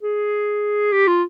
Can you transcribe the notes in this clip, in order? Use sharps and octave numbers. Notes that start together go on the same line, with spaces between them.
G#4
G4
F4